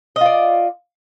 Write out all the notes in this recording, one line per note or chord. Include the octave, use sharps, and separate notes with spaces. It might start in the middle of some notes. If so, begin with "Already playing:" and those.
F4 D5 D#5